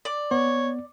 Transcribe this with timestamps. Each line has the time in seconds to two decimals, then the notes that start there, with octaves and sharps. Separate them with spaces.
0.05 D5
0.31 B3 C#5